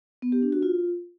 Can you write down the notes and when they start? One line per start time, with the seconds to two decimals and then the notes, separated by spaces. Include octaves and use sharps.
0.22 B3
0.32 G4
0.42 D4
0.52 F#4
0.63 F4